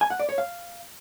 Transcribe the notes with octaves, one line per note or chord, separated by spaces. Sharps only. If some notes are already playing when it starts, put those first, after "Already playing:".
G#5
F#5
D5
C#5
F5